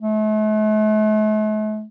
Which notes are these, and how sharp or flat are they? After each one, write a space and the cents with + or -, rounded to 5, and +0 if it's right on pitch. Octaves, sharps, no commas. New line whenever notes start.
A3 -45